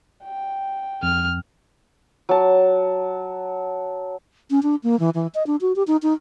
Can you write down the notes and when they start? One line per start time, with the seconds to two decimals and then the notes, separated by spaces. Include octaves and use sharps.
0.24 G5
1.03 F2 F6
2.29 F#3 A5
4.50 C#4
4.63 D4
4.83 A#3
4.99 E3
5.15 E3
5.35 D#5
5.47 D4
5.61 F#4
5.76 G4
5.87 D#4
6.03 D#4